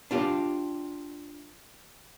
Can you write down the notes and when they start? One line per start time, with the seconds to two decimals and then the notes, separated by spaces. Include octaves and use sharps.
0.11 D4 F4 G4